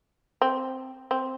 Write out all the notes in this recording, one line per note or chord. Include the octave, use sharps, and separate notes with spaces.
C4
C4